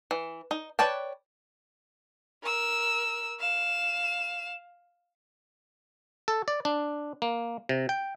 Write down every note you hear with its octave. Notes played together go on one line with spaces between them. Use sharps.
E3
D#4
B4 C#5 D5 G5 A5
A#4 E6
F5 E7
A4
D5
D4
A#3
C3
G5